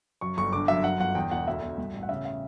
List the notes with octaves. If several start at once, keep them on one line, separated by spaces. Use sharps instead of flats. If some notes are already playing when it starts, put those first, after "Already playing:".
F#2 C#6
G1 C#6
D3 D6
F#2 E5
F#2 F#5
G1 F#5
E2 G5
E1 F#5
D2 E5
E1
G2
A1
F#5
C#3 E5
E5